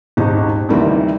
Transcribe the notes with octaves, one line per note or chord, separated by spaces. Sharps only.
D#1 G#1 D#4
D2 C3 D#3 E3 G3 A#3